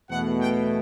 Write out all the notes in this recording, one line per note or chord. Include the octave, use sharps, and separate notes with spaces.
E2 B2 A3 F#5
G5